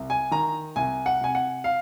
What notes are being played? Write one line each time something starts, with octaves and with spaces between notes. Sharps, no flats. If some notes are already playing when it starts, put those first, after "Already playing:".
Already playing: C2
G#5
D#3 A#5
C2 G#5
F#5
C3 G#5
F#5
F5